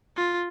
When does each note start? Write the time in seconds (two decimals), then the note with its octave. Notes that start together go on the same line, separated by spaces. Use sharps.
0.16 F4